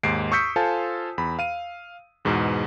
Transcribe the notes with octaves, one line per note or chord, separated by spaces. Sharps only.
D#2 G#2 C7 D7
C#6 D#6 E6 G6 B6 C#7
F4 A4 C5 F5 G#5 A5
E2 B5
F5 D#7
E2 G#2 B2